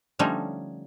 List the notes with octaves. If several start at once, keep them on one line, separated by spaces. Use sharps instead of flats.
D3 F3 G3 A3 C#4 D#4